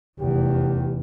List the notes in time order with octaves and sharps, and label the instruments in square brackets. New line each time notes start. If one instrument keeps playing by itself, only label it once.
[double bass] F1 E2 [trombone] G4